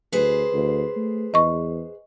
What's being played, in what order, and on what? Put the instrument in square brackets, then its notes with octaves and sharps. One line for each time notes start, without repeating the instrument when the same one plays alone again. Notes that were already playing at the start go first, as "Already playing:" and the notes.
[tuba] D2 [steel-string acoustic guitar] G#4 B4 C5
[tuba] D2
A3
[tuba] E2 [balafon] D#5 C#6